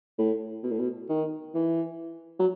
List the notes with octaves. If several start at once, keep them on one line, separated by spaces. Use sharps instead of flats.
A2
B2
A2
B2
D#3
E3
F#3